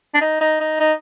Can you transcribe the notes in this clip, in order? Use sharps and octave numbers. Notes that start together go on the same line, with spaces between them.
D4
D#4
D#4
D#4
D#4